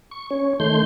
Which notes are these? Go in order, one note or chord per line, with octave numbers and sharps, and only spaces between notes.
C#6
C#4 C#5
D#3 A3 C6 G6